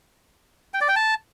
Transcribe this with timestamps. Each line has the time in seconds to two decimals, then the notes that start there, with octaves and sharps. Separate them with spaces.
0.74 G5
0.81 D5
0.88 G5
0.96 A5